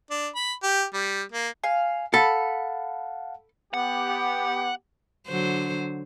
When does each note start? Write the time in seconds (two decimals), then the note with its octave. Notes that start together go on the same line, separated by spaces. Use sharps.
0.10 D4
0.35 B5
0.63 G4
0.94 G3
1.32 A#3
1.64 F5 G#5
2.14 A4 F5 F#5 A5 B5
3.74 B3 G4 F#5
5.28 D3 F#3 C5